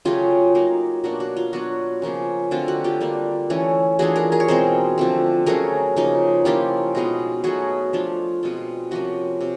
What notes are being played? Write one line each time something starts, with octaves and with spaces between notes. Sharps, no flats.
C#3 F#3 A3 C#4 F4 G4
F#3 A#3 D#4
B2 F#3 A#3 D4 F#4
F#4
F4
F#3 B3 D4 F4 F#4
C#3 F3 A#3 C#4
D3 F#3 A3 C4 F4
F#4
F4 G4
G3 A#3 D4
E3 A3 C#4
E3 A3 D4 F4 F#4 G#4
G#4 A#4
G#4 A#4
C#5
B2 G#3 C4 A#4 C5
D3 F3 A3 C4
F#3 A3 C#4 G#4 A#4
C#3 F3 A#3 D#4
F3 A#3 C#4 E4 F4 G4
B2 G#3 B3 D#4
B2 F#3 A3 F#4 G#4
F3 A3 D4 F4
B2 G#3 C4 F4
C3 F3 A#3 C#4 F#4
C3